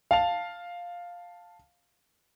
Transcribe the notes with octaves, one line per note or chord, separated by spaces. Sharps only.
F5 A5 F7